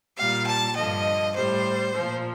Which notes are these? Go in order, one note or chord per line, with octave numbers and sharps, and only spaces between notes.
A#2 G3 F5
A5
G2 D3 F3 D#5
A2 G3 C5
A#2 F3